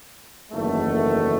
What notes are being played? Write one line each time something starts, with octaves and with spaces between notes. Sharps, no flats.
F#1 E2 D#3 A3